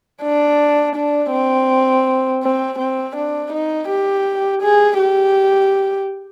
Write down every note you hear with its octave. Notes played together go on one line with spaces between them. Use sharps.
D4
D4
C4
C4
C4
D4
D#4
G4
G#4
G4